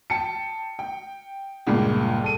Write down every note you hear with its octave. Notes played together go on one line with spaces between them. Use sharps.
G5 A5 C#7
G5
C#2 G2 A#2
A4 D#7